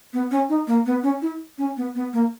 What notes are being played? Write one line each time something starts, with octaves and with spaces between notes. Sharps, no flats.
B3
C#4
D#4
A#3
B3
C#4
E4
C#4
B3
B3
A#3